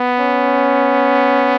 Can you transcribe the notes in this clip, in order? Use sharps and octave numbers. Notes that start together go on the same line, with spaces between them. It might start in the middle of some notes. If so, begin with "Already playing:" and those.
Already playing: B3
C#4